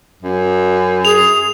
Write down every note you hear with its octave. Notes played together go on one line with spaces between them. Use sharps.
F#2
G#4 F7